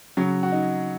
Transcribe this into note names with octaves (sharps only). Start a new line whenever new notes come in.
C#3 F#3 F#4
F#4
D#4